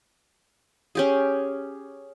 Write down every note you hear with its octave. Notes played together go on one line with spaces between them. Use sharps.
C#4 G4 G#4